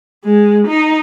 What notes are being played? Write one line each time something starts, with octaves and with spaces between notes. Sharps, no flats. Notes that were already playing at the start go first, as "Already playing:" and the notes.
G#3
D#4